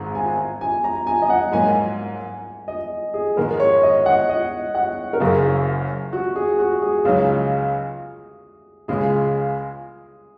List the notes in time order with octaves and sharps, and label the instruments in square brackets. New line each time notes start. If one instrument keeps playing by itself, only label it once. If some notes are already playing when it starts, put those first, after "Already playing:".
Already playing: [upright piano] G#1 G#2 G#3 [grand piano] A#5
[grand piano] G#5
G#5
A#5
G#5
D#5
F#5
[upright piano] G#2 F#3 A#3 [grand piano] G#5
[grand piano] D#5
G#4
[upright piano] G#2 D#3 G#3 [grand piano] A#4
[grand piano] C#5
D#5
F#5
D#5
F#5
A#4
[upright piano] F#1 F#2 C#3 [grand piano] G#4
[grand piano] F#4
G#4
F#4
G#4
[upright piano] C#2 C#3 F#3 D#4 [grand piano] G#4
[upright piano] C#2 C#3 G#3 [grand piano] G#4